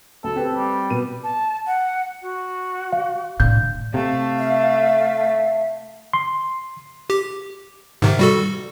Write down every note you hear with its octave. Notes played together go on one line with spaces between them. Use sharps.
D2 A4
C4 G4 B4
G3
B2 B3 D#7
A5
F#5
F#4
F5
A2 D3 G6
C3 A3 F5
E5
C6
G4
G#2 C3 D#3
G3 F#4 A4